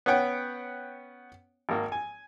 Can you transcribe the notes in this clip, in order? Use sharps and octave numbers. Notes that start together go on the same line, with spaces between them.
B3 C#4 C#5 F#5 G5
G#1 A#3
G#5